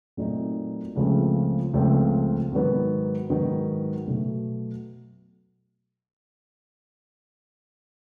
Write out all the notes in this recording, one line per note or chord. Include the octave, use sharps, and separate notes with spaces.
A#2 F#3 A3 C4 D#4
C#2 C#3 F3 A3 C4
C#2 C#3 F3 A3 C4
G#2 D#3 F#3 B3
G#2 D#3 F#3 B3
B2 F#3 A3